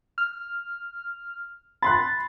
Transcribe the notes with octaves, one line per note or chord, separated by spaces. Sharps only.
F6
B5 C6 F#6 A6